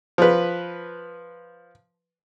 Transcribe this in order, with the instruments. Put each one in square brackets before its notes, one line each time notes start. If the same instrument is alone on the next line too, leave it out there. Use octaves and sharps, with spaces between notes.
[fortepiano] F3 B4